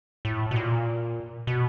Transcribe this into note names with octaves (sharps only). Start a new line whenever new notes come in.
A2
B2
A#2
B2